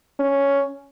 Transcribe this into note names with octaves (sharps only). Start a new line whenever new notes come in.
C#4